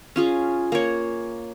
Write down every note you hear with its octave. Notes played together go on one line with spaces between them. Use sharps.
C#4 F4 G#4
A#3 C#5